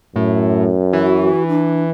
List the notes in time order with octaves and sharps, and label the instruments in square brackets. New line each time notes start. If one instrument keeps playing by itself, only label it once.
[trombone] F#2 [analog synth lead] A2
[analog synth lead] E3 [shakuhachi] F#4
[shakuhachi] D4